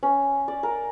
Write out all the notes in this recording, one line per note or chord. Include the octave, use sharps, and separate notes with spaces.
C#4
D5
A#4